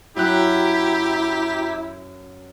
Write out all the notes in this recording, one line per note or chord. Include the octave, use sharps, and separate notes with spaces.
F#2 E4 F#4 G4 G5 A#5 F#6